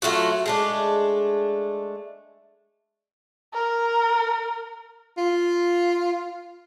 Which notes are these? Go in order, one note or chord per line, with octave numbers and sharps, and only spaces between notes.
F#3 A3 F4 F#4
G#3 A3 D4
A#4
F4